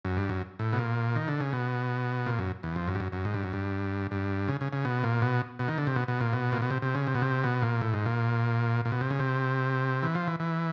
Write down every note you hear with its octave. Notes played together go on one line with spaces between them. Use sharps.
F#2
G2
F#2
A2
B2
A#2
D#3
D3
C#3
B2
A#2
F#2
E2
F2
F#2
G2
F#2
F#2
G#2
G2
F#2
G2
G2
C#3
C#3
C#3
B2
A#2
B2
B2
D#3
D3
C3
B2
B2
A#2
B2
A#2
B2
C3
C3
C#3
C3
B2
C3
B2
A#2
A2
G#2
A#2
A#2
B2
C3
C#3
C3
E3
F3
E3
E3